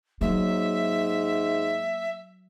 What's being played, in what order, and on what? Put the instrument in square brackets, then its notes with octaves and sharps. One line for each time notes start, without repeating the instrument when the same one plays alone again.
[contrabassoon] G#2 [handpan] F#3 [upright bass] A#3 [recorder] E5